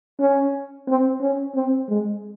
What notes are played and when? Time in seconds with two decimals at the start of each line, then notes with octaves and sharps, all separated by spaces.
0.19 C#4
0.87 C4
1.21 C#4
1.56 C4
1.88 G#3